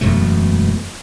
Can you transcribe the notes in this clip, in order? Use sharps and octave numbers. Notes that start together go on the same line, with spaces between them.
E1 F#2 B2 A3